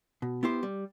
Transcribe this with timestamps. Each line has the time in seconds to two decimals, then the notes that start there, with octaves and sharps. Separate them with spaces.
0.22 B2
0.43 B3 E4 G4 C5
0.63 G3